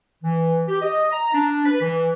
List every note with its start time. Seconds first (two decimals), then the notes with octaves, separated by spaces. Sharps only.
0.24 E3
0.68 G4
0.81 D#5
1.11 A#5
1.33 D4
1.66 B4
1.81 E3